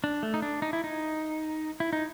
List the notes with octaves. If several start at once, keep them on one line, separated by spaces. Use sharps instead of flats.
D4
A3
D#4
D4
D#4
E4
D#4
E4
D#4